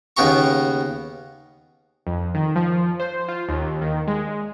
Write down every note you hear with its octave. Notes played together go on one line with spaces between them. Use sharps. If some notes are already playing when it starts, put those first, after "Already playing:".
D#2 C#3 B3 G4 A#5 C#6
F2
D#3
F3
C5
F4
D#2
D#3
G#3